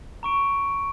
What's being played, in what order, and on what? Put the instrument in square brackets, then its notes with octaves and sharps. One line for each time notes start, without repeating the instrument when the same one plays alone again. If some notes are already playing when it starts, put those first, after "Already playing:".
[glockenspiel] A#5 C#6 D7